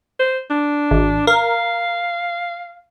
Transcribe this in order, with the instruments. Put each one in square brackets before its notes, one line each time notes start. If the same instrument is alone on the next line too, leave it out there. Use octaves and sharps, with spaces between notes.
[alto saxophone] C5
D4
[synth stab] G#1
[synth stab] A#4 [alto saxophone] F5